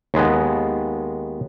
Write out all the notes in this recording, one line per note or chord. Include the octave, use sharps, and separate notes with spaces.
D#2 G#3 B3